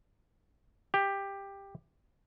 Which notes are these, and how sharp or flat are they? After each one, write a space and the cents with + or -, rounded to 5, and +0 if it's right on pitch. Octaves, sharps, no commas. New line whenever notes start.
G4 +10